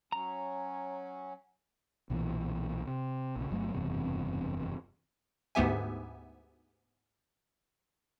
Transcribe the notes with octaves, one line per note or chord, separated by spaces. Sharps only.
F#3 C#4 A#5
B1 A#2 E3
C3
A#1 C#3
G1 F#3 A3
F#1 E2 G2 C3
D2 G#2 B3 G4 E5 G#5